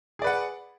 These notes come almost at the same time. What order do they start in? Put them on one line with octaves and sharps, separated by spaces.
G#4 D5 B4 F#5